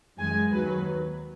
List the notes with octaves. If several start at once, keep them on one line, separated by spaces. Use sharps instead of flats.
F#2 E3 G#3 G#5
D#2 D#3 F#3 B4